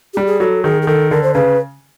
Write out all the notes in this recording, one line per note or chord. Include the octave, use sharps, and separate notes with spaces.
G3 G4
G#4
F#3 A4
D#3 G#4
G#4
D#3 A4
D3 A#4
C5
C#3 B4